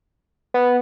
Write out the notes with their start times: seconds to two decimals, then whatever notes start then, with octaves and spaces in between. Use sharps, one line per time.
0.54 B3